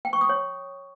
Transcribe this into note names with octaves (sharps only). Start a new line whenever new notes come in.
G5
C#6
D#6
C#5